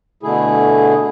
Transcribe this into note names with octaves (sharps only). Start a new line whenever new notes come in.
B2 D3 A3 E4 G#4